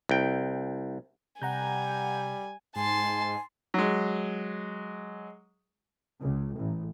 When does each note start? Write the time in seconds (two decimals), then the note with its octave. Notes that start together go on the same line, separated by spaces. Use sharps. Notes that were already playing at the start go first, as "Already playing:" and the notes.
0.09 C2 G5
1.42 C3 G3 F#5 G#5 A#5 G6
2.76 G#2 G#5 A5 C6
3.74 F#3 G#3
6.20 C#2
6.56 A1